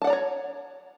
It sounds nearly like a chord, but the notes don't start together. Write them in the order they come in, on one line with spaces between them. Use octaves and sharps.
A5 F#5 D5 A#5 C#5